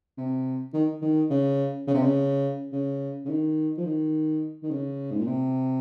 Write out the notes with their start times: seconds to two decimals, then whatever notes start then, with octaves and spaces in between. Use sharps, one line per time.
0.17 C3
0.73 D#3
1.02 D#3
1.30 C#3
1.87 C#3
1.94 C3
2.02 C#3
2.72 C#3
3.25 C#3
3.29 D#3
3.77 F3
3.85 D#3
4.63 D#3
4.71 C#3
5.11 G#2
5.19 A#2
5.27 C3